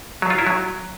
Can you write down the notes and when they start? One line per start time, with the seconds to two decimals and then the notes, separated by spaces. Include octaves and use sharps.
0.22 F#3
0.30 F4
0.38 E4
0.47 F#3